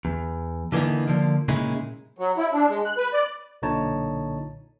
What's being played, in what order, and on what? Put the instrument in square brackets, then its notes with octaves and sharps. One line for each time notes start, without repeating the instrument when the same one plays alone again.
[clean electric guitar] E2
D3 E3 A#3 B3 D#4
D3 F3 A#3
A#2 C#3 G#3 D#4 E4
[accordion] F#3
E4
D4
G#3
F#6
B4
D5
[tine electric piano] B1 A#2 D3 D#4 C#5 A5